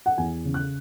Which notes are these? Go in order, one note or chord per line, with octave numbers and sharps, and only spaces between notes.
F#5
E2 G#5
C#3
F#6